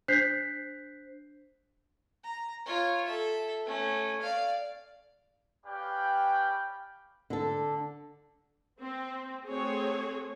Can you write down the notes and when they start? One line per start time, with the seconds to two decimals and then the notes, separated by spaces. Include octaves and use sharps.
0.08 D4 C5 F#6 G6 B6 C7
2.24 A#5
2.66 F4 C#5
3.06 A4 E5
3.66 A3 C#4
4.22 D5 F5
5.66 C#4 G4 B4 D5 F5 G5
7.30 D3 A4
8.81 C4
9.47 A3 C4 F#4 G#4 C#5